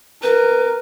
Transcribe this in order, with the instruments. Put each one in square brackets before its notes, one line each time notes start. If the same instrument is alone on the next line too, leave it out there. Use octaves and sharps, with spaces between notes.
[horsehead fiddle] A#4 [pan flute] B4